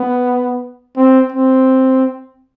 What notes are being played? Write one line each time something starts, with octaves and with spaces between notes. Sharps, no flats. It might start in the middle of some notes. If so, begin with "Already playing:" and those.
Already playing: B3
C4
C4